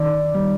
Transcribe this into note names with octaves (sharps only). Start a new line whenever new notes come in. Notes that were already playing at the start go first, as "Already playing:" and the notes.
Already playing: D#3 D5
G3